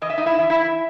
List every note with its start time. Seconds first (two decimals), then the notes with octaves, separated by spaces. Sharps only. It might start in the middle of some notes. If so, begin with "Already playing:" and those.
0.02 E3 D#5
0.10 E5
0.18 D#4 D#5
0.26 E4 E5
0.38 E3
0.50 E4 E5